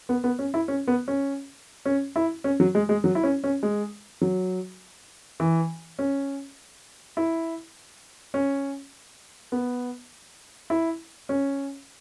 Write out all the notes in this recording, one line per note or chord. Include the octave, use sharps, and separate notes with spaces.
B3
B3
C#4
E4
C#4
B3
C#4
C#4
E4
C#4
F#3
G#3
G#3
F#3
E4
C#4
C#4
G#3
F#3
E3
C#4
E4
C#4
B3
E4
C#4